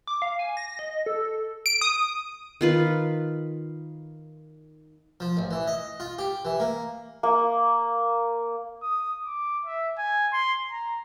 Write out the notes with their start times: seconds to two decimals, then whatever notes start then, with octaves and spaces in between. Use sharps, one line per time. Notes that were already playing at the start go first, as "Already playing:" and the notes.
0.07 D6
0.22 F5
0.39 G#5
0.57 A#6
0.79 D#5
1.06 A4
1.66 D7
1.81 D#6
2.61 D#3 F4 B4
5.20 F3
5.37 A1
5.51 E3
5.67 D#5
6.00 F4
6.19 G4
6.45 E3
6.60 A#3
7.23 A#3
8.82 D#6
9.25 D6
9.65 E5
9.98 G#5
10.33 C6
10.71 A#5